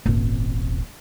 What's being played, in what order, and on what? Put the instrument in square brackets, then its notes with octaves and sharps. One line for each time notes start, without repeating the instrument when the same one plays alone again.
[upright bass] D#1 G#1